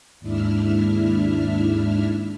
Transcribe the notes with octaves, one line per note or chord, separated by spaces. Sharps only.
D#2 G#2 D4 E4 E5 F6